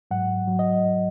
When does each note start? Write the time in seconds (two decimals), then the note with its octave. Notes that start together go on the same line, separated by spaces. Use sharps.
0.11 G#2 F#3 F#5
0.47 F#3
0.59 D#5